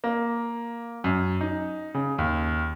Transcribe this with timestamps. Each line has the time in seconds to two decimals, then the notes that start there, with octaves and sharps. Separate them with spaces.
0.04 A#3
1.04 F#2
1.41 D#4
1.94 C#3
2.18 D#2